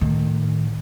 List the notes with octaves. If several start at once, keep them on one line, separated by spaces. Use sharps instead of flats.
A2 D#3